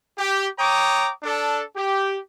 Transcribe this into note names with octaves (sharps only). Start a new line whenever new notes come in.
G4
C#5 G5 A#5 D6 D#6
D4 A4
G4